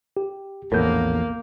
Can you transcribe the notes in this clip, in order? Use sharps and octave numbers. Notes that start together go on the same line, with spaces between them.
G4
A#1 E2 A2 A#3 A#4 G6